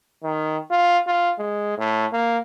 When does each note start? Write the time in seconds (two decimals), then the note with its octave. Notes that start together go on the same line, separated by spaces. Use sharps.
0.23 D#3
0.71 F4
1.07 F4
1.38 G#3
1.78 A2
2.13 A#3